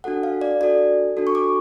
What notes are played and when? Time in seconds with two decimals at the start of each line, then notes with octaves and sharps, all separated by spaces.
0.04 D4 F#4 A4 F#5
0.23 F5
0.41 D5
0.60 D4 F#4 A4 D5
1.17 D4 F#4 A4
1.27 C#6
1.35 D6